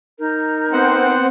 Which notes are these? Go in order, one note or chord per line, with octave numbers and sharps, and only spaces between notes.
D#4 A#4 G6
B3 C4 C5 F#5